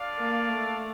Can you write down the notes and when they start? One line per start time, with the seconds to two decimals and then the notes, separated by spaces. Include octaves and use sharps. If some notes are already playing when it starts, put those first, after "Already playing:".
Already playing: D4 F4 A4 D5 F5
0.18 A#3
0.49 A3